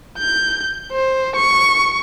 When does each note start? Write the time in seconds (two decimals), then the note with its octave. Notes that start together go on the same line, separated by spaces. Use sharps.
0.18 G6
0.91 C5
1.36 C#6